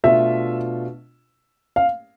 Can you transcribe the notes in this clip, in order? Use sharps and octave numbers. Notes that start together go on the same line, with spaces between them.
B2 A3 D4 F4 E5
F5